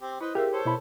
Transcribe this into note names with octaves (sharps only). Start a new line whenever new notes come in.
C4 G4
E4 B4 C5 D#5
C4 F4 G4 G#4 A#4 E5
A4 C5 C#5
B2 E4 B5